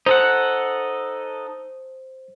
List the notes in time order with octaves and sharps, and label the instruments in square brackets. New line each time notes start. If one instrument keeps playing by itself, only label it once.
[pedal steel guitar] D#4 A4 F#5 [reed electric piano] C5